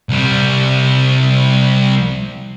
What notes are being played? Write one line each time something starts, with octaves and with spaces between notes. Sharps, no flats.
C2 G3